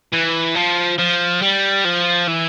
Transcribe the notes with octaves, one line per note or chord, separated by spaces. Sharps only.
E3
F3
F3
G3
F3
E3